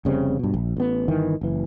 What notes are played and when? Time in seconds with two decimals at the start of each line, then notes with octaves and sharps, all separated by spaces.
0.05 F1 C#3 G3 C4
0.39 G2 B2
0.54 A#1
0.77 A1 B3
1.08 G1 D#3 E3
1.41 F#1 E3